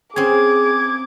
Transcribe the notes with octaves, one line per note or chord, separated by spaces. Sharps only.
C4 C#4 G#4 D6 G#6